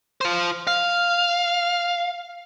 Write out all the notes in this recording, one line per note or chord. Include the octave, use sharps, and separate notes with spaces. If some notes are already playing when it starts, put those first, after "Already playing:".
F4 C5
F5